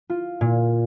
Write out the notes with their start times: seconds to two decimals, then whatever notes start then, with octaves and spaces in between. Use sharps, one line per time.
0.10 F4
0.41 A#2